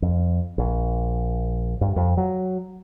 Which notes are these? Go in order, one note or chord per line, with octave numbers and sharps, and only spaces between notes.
F2
A#1
G2
F2
F#3